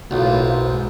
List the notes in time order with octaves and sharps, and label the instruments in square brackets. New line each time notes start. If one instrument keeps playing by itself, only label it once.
[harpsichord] B1 [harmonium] A2 A#3 F4
[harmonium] C5
G#2